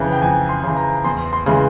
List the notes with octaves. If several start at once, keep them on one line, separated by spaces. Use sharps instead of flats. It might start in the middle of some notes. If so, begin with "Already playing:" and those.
Already playing: F2 C#3 E3
G5
F2 G#5
C6
C#3 E3
A#5
E2 C6
C6
C#3 E3 G#3